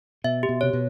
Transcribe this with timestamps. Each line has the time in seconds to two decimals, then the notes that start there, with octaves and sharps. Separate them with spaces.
0.24 B2 E5
0.43 G4
0.49 B2
0.61 C3 C#5
0.73 B2